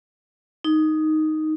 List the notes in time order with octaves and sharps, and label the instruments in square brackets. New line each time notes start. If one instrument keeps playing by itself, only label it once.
[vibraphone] D#4